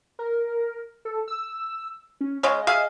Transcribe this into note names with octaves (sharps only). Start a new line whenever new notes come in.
A#4
A4
E6
C#4
C#3 G#3 C#4 D#5
G#4 E5 F5